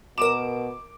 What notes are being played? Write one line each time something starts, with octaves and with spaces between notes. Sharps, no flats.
B2 A#4 D6 E7